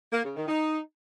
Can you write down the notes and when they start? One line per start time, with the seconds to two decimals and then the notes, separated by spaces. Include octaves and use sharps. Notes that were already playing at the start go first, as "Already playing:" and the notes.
0.13 A#3
0.24 C#3
0.36 D#3
0.48 D#4